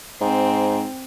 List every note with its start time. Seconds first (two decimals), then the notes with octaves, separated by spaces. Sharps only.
0.21 G#2 C4